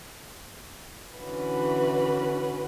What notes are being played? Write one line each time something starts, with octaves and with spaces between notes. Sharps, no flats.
D3 E3 C#4 F#4 B4